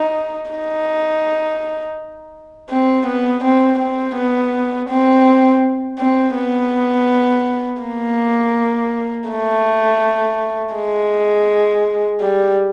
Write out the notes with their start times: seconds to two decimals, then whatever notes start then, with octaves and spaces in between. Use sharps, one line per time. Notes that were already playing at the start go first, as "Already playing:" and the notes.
Already playing: D#4
0.51 D#4
2.70 C4
3.06 B3
3.44 C4
3.79 C4
4.16 B3
4.89 C4
5.99 C4
6.36 B3
7.82 A#3
9.29 A3
10.74 G#3
12.21 G3